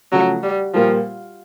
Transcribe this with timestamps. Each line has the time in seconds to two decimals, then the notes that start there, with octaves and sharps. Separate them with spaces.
0.12 C#3 F3 F#3 A3
0.43 G3
0.74 A#2 F3 G3 A#3